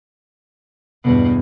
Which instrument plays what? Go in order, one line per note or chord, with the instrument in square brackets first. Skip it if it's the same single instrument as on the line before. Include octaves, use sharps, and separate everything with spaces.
[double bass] E2 G2 [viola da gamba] B2